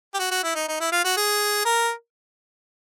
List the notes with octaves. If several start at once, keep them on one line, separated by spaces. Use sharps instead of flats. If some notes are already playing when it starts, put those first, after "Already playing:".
G4
F#4
F#4
E4
D#4
D#4
E4
F4
F#4
G#4
A#4